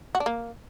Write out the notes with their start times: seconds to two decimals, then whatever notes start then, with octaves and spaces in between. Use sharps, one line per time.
0.15 F#4
0.20 D4
0.26 A#3